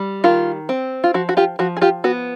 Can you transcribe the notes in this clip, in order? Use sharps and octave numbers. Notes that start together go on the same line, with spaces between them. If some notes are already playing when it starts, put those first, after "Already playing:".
Already playing: G3
D#3 F4
C4
F4
F3 F#4
F#4
F4 G4
F3 F#4
G#4
F4 G4
B3 F#4